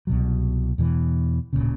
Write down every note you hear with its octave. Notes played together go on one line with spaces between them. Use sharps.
C2 B2 F#3
E2 B2 E3
D1 B1 A#2 C#3